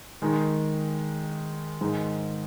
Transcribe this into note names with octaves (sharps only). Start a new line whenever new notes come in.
D#3 G#3 D#4
G#2 D#3 G#3 D#4